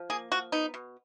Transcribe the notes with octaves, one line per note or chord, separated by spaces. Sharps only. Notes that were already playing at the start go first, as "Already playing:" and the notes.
Already playing: F3
A#3 G#4
F3 F#4
B3 D#4
B2